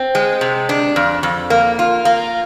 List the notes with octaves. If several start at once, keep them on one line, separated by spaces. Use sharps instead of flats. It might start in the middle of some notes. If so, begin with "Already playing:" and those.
Already playing: C4
G#3
C3
D4
F2
F2
A#3
F4
A#3